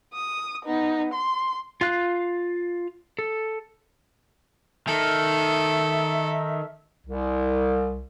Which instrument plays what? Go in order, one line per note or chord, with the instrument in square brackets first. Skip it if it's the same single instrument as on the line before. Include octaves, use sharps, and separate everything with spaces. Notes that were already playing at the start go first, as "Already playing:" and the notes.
[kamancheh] D#6
B3 D#4
C6
[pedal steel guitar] F4 F5 F#6
A4
[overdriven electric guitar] D#3 [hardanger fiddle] A4 [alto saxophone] E5
[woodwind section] C2